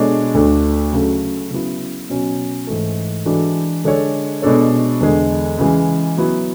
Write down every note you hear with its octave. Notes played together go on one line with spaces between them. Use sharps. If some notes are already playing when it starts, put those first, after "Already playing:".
Already playing: B2 G#3 D4 A4 C#5
D2 D3 A3 D4
C#3 F#3 A3
C#3 F#3 B3 E4
B2 F#3 C#4
G#2 E3 A3
E3 G#3 D4 F#4 A4
D3 G#3 D4 A4 C#5
B2 G#3 D4 A4 C#5
E2 D3 G#3
C#3 E3 G#3
F#3 B3 E4